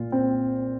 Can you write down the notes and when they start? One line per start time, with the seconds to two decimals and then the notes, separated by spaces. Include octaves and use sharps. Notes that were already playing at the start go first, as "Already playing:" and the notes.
Already playing: A#2 F4
0.12 C4